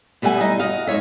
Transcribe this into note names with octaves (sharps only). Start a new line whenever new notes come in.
B2 G3 A3 F#5 G#5
D#4 E4
F#4 D#5 F5
G#2 B2 C#5 E5